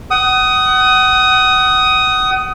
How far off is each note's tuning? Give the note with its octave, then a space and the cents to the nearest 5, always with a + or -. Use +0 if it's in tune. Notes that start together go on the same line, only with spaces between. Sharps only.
F#5 +35 D#6 +10